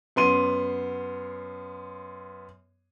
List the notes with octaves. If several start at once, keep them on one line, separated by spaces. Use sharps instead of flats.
F#2 B3 C6 D#7